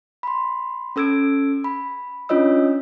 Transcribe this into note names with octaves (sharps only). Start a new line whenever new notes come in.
B5 C6
C#4 A4 E6 G#6 D7
B5
C#4 D4 F4 C#5 D#5 E6